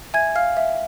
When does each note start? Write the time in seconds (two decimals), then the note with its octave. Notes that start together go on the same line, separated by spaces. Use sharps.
0.14 E5 G#5 G#6
0.36 F5 F6
0.57 E5